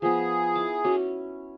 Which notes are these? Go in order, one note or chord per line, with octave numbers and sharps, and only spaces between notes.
F3 B3 G#4
E4 D6
C#4 F#4